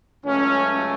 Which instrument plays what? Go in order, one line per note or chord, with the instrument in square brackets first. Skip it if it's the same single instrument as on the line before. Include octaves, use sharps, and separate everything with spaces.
[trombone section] C#2 C#3 F#3 A3 [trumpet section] C#4